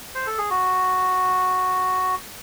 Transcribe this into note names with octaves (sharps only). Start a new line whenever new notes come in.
C5
A4
G#4
F#4